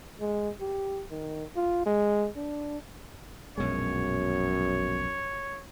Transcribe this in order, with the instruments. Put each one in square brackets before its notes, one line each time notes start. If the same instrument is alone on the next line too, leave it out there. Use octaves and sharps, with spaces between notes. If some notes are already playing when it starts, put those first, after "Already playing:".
[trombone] G#3
G4
D#3
F4
G#3
D4
[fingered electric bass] A#1 B2 G#3 [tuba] F#2 [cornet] C#5